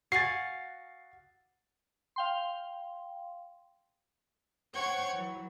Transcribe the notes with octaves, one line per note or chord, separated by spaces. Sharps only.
F#4 F5 G#5 A6 C7
F5 G5 C6
C5 C#5 F#5 G5 C#6 G#6
E3 F#3